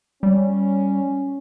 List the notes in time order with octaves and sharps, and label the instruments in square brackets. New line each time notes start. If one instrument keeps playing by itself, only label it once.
[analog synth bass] G3 [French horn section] C#4